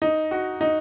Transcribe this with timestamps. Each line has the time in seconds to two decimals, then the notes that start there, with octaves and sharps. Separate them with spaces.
0.02 D#4
0.31 F#4
0.61 D#4